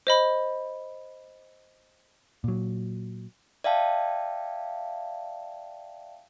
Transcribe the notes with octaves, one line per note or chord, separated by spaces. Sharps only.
C5 D#5 B5
A#2 F#3
D5 E5 F5 G5 A5